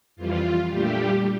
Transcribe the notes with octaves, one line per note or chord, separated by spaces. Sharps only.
F2 E3 G3 F4
A#2 G3 A3 D4 G4